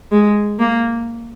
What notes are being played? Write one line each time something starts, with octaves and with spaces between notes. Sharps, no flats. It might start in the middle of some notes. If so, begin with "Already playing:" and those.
G#3
A#3